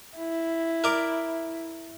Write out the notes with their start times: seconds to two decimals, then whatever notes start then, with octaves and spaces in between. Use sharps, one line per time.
0.17 E4
0.84 A#4 D5